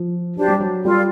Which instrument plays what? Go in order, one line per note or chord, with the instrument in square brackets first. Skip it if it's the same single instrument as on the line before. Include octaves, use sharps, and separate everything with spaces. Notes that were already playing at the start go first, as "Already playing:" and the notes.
Already playing: [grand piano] F3
[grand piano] F#3 [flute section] D4 G4 C5
[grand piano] G3
F#3
[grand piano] G3 [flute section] F4 A4 D5